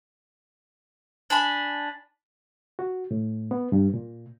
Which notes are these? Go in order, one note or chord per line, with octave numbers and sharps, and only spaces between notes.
D4 G#5 B5
F#4
A2
B3
G2
A#2